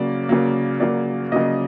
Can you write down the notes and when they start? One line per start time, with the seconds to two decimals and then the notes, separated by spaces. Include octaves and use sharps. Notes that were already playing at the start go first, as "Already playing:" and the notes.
Already playing: C#3 F#3 A#3 D5
0.29 C#3 F#3 A#3
0.80 C#3 F#3 A#3 D5
1.32 C#3 F#3 A#3 D#5